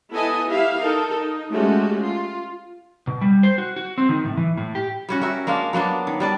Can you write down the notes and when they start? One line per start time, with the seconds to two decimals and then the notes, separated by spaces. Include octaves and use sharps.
0.12 B3 E4 A4 D#5 G#5
0.48 E4 G4 E5 F5
0.81 D#4 A4 A#4
1.16 D#4
1.52 G#3 A3 C#4 F#4 G4
2.02 F4
3.07 B2
3.21 G3
3.43 C5
3.58 F#4
3.76 F#4
3.98 C4
4.09 D#3
4.26 A2
4.37 E3
4.57 A2
4.75 G4
5.09 G3 C#4 F#4
5.21 F#4 A#4 E5
5.47 G#3 A#3 D4 F5
5.73 F#3 A#3 B3 D4
6.07 D#3
6.20 G3 D4 D5